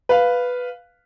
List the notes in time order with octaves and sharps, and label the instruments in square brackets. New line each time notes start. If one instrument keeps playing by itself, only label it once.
[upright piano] B4 F5